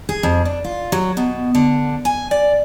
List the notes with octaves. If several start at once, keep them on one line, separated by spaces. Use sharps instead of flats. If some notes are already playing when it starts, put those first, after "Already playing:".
G#4
F2
D4
F4
F#3
B2
D3
G#5
D5